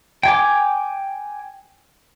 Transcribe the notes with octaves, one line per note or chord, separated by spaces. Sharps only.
G5 G#5 D6